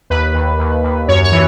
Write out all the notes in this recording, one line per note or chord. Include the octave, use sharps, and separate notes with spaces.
D#2 B4
D#2
D#2
D#2
F#2 C#5
C#5
E3